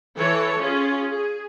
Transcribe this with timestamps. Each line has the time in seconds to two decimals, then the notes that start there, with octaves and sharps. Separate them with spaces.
0.17 E3 A4 C#5
0.61 C#4 F4 G#4
1.11 G#4